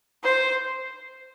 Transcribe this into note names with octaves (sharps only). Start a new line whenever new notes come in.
C5